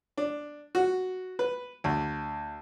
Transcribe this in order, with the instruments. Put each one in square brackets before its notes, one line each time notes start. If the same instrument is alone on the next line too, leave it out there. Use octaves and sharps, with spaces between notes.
[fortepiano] D4
F#4
B4
D2